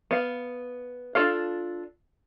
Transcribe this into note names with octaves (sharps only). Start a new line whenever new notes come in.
B3 F5
D4 F4 A4 F5